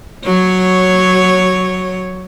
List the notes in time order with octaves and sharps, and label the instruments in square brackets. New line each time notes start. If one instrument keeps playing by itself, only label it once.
[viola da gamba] F#3 C#5